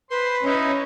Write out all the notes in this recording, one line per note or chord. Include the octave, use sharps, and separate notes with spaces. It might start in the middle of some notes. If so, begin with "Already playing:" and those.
B4 C5 C6
C#4 D#4 E4 D#5